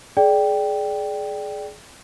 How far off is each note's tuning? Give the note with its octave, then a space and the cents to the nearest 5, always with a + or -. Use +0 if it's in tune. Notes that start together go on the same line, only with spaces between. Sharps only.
G#4 +25 D5 +0 G5 +0